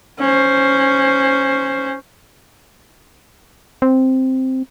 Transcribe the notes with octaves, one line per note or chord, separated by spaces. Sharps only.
C#4 C5
C4